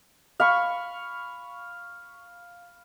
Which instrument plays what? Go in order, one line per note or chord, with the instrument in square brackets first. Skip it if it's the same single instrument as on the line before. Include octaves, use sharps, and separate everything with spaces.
[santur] F5 B5 C#6